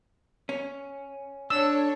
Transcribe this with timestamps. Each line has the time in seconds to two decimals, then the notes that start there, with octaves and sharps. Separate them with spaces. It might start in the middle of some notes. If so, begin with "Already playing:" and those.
0.49 C#4
1.50 D4 A4 C#5 E6